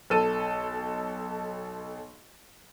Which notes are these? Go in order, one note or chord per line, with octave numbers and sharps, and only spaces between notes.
B1 A4 D#7